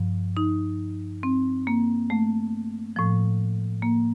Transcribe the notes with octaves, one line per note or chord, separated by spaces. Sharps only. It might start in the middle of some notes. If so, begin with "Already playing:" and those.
Already playing: G2 F3
D#4
C4
A#3
A3
A2 F3
A#3